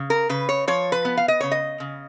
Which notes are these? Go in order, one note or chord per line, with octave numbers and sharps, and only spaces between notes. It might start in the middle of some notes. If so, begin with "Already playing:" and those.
Already playing: C#3
A#4
C#3 B4
C#5
F3 C#5
B4
B3
F5
D#5
C#3 C#5
D#5
C#3